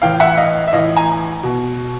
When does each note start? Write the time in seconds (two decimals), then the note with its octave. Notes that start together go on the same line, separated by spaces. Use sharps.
0.02 A2 E3 F5 G5
0.20 E5 F#5
0.38 D#5 F5
0.68 E5
0.72 A2 E3 D#5 F5
0.96 G#5 A#5
1.43 B2